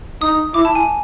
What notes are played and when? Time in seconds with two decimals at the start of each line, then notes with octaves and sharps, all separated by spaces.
0.21 D#4 D#6
0.54 E4 D6
0.65 A5
0.75 G#5